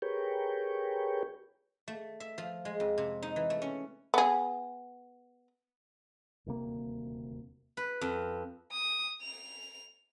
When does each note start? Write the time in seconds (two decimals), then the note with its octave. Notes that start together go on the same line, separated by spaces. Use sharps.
0.02 G4 G#4 A#4 B4 C#5 G5
1.88 A3
2.20 E5
2.38 F3
2.65 G#3
2.80 F2
2.98 C3
3.22 D#4
3.36 E3
3.50 A3
3.62 C#4
4.14 B3 G#4
6.46 D#1 D2 C3 A#3
7.77 B4
8.01 F2
8.72 D#6
9.22 F7